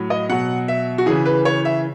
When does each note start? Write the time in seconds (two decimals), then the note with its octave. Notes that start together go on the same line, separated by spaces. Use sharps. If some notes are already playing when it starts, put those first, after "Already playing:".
Already playing: A2 F#3
0.10 D#5
0.29 B2 F#3 F#5
0.68 E5
0.98 F#4
1.06 C#3 E3 G#4
1.26 B4
1.45 C#5
1.65 E5